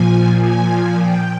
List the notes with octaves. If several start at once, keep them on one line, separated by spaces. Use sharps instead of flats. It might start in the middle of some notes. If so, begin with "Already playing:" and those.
Already playing: A#2 F3 G#5
G#5
G5